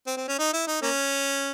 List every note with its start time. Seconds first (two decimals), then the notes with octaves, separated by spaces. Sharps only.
0.07 C4
0.17 C4
0.28 C#4
0.39 D#4
0.53 E4
0.67 D#4
0.82 A#3 C#4